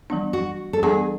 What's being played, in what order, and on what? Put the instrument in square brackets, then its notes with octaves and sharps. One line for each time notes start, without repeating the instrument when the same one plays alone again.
[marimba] E3 G3 B3 D4
[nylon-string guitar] F#4
A4
[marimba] E3 G3 B3 D4 [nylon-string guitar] G#4